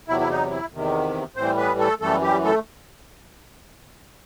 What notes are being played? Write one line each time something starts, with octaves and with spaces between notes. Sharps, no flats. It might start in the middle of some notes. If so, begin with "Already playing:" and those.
E2 C3 F#3 E4
E4
D#4
E4
E2 C3 D#3
A2 E3 G3 C4 C5
B3 B4
A3 A4
F#2 E3 G3 A3 A4
G3 G4
A3 A4